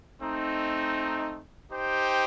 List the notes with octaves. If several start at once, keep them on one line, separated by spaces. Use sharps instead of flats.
A3 C4 D#4
D#4 G4 C5 G5